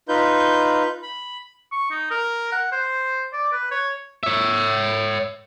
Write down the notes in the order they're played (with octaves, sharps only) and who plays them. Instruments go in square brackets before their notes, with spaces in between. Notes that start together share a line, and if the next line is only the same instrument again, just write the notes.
[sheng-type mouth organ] D#4 F4 B4 G6
B5
[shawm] C#6
D#4
A#4
F#5
C5
D5
B4
C#5
[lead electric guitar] C#5 E5